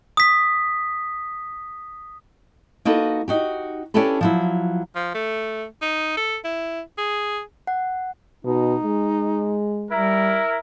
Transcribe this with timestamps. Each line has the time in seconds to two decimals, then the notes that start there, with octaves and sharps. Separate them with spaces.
0.17 D#6 B6
2.85 A#3 D#4 F#4 A4 B4
3.28 D#4 F#4 G4
3.94 C#4 D4 E4 G4 A4 B4
4.21 F3 F#3 E4
4.95 F3
5.15 A3
5.82 D#4
6.17 A4
6.45 E4
6.98 G#4
7.67 F#5
8.45 B2 D#4
8.83 G#3
9.91 G3 E4 A#4